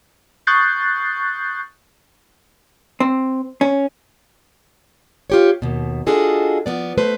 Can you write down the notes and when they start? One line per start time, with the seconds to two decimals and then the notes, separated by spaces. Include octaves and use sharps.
0.47 C#6 D#6 F#6 G6 A6 C7
3.00 C4
3.61 C#4
5.30 F4 G4 C#5
5.62 D#2 B2
6.06 D4 F4 F#4 G#4 A4 D#5
6.66 F3 B3 D5
6.98 A3 B4 C5